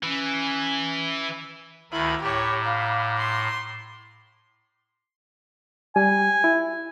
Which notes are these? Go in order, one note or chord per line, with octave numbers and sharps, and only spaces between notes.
E3 C#4
D2 D#3 E4 A#5 B5 E6
A2 G4 C#5 A#5 B5 D6
F5
C6
G3 G#5
E4